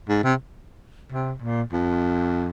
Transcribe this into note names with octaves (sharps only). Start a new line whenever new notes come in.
G#2
C3
C3
A#2
F2